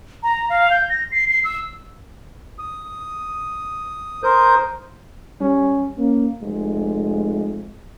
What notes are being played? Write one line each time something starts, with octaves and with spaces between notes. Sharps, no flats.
A#5
F5
G6
A#6
C7
C7
E6
D#6
A#4 C5 D#6 G6
G3 C#4
A#3 C#4
F1 G#3